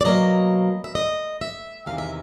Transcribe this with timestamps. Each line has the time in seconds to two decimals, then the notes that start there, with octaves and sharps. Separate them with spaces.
0.01 D5
0.05 B2 F#3 A#3 D#5
0.84 E5
0.95 D#5
1.41 E5
1.86 E2 C3 D#3 G#3 F5
1.98 E5